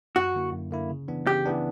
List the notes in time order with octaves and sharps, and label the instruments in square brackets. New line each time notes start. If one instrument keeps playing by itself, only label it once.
[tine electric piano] F#2 [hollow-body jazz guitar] F#4
[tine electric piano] D3 A#3 E4
F#2
D3 A#3 E4
C#3
E3 B3 D4
[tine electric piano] C#3 [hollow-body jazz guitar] G4
[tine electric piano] E3 B3 D4